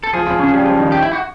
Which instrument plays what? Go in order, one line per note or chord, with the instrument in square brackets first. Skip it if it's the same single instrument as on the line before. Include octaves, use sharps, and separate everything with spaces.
[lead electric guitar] A4
[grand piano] F3 F4 [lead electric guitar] G#4
[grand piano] F3 F4
C#3 C#4
G3 G4
F3 F4
D#3 D#4
[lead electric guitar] G4
E4
F#4